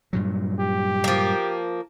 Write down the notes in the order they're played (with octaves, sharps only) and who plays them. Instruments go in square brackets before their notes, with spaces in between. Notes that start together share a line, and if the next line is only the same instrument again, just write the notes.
[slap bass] G2 A#2 F#3
[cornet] G4
[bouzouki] F3 A#3